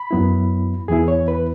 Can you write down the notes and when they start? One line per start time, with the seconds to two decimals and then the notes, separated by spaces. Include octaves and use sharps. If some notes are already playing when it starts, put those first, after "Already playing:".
Already playing: B5
0.11 F#2 F#3 B3 E4
0.88 E2 E3 B3 E4 G#4
1.08 C#5
1.28 B4